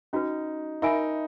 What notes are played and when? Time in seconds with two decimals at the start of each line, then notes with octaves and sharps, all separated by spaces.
0.13 C#4 D#4 F#4 B4
0.82 D#4 A#4 E5 G#5 B5